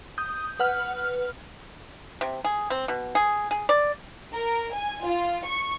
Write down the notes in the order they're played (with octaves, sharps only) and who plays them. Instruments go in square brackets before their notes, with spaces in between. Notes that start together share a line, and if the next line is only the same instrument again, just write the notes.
[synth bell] D#6 G6
B4 F#5 F6
[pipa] C3
G#4
C4
B2
G#4
G#4
D5
[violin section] A#4
G#5
F4
C#6